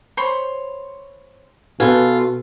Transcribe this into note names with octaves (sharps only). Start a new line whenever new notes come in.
C5 C#5 B5
B2 F4 F#4 A4 B4 G#5